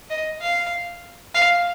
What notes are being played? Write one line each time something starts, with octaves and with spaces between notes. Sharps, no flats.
D#5
F5
F5